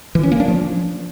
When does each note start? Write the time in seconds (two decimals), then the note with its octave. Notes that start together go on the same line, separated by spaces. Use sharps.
0.15 E3
0.23 C#4
0.32 A#3
0.40 D4
0.48 F3